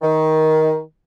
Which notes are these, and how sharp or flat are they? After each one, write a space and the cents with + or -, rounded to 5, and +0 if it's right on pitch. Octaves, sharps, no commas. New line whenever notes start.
D#3 +15